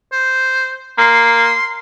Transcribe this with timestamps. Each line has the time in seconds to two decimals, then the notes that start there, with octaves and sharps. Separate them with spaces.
0.12 C5
0.98 A#3 C6